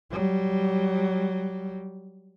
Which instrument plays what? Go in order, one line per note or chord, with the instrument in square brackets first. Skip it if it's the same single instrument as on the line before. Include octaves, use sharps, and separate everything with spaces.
[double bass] F#3 G3